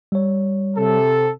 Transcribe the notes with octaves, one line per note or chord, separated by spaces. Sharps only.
G3 C#5
C3 A4